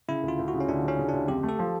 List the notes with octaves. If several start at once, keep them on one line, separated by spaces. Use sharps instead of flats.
C#3 E4
D2
F4
D2
F#4
C#3
C#4
D2 D4
C#3
C#4
C#3
D2 D4
F2 G4
A3
A4
F3